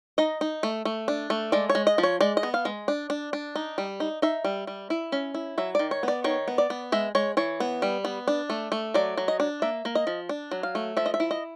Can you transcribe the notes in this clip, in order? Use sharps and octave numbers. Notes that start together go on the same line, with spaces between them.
D#4 D#5
D#4
A3
A3
D4
A3
G#3 D5
C#5
G#3
D#5
F3
C#5
G#3 D5
D#5
B3
F5
G#3
D4
D4
D4
D#4
G3
D#4
D#4 E5
G3
G3
E4
C#4
E4
F#3 E5
D#3 D5
C#5
B3 D5
D#3 C#5
B3
D5
B3
G#3 E5
G#3 C#5
E3 C#5
B3
G3
B3
D4
A3
A3
F#3 D5
F#3
D#5
D4
A#3 E5
A#3
D#5
F3
D4
F#3
F5
A3
F3 E5
D#5
E5
E4
D#5